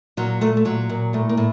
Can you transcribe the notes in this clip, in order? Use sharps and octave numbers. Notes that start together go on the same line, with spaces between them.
A#2 F#3
A#2 A3
A3
A#2 F#3
A#2
A2 A3
A#3
A2